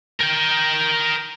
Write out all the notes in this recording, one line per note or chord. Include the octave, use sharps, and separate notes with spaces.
A#4 G5